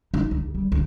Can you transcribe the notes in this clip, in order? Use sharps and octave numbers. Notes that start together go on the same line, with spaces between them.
D#4
D2
G3
D2